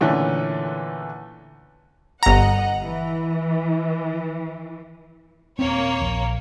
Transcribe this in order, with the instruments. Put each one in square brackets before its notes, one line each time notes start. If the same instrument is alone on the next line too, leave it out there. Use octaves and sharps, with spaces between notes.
[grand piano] A#2 D3 E3 A3 C#4
[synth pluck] G1 A#5 [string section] D#5 F#5
[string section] E3
[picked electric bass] D#1 C4 [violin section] A#3 C#5
[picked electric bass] A#1